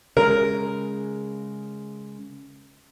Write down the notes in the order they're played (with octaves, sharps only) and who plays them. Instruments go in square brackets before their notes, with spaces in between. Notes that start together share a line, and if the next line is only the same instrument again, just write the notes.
[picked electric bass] C#3 G#3 [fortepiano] A#4